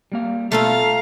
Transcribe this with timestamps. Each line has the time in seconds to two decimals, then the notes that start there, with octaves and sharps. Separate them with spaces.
0.12 G3 A#3 F5
0.52 B2 A3 F4 A4 F5 A#5